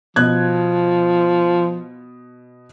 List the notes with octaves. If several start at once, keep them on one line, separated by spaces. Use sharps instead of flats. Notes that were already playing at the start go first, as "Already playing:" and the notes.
B2 F3 F#6 G#6